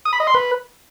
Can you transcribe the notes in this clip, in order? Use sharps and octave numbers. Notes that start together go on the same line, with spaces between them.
D#6
B5
D#5
C6
B4